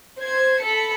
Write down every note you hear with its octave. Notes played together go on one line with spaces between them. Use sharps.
C5 G#6
A4 B5 C#7